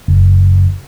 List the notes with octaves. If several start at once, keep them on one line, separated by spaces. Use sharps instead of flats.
F#1